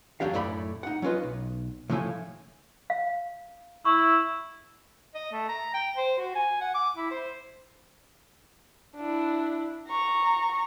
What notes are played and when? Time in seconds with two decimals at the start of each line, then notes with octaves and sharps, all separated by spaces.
0.20 E2 D3 F#3 D4 G4 F5
0.33 F#2 A2 A3 D5 E5 B5
0.83 D#4 F#5
1.02 F#3 C#4 F4 B4 D#5
1.23 B1
1.90 A2 C#3 F3 A3 E4 G#5
2.90 F5
3.85 E4 C#6
5.15 D#5
5.32 A3
5.49 A#5
5.74 G5
5.97 C5
6.19 F#4
6.35 G#5
6.61 F#5
6.74 D6
6.97 E4
7.11 C5
8.97 D4 E4
9.89 A#5 C#6